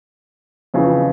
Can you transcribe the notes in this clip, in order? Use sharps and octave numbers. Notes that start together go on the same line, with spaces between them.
F2 C#3 E3